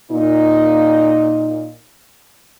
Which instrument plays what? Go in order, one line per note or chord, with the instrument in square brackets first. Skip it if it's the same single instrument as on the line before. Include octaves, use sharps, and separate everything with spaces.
[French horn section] A#2 D#4